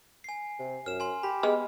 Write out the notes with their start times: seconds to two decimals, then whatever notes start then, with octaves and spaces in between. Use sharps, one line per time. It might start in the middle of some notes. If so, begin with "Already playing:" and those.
0.24 G#5 C7
0.59 C3
0.86 F#2 F6 E7
1.00 G#5 C6
1.23 G4 B5
1.43 G#3 B3 F6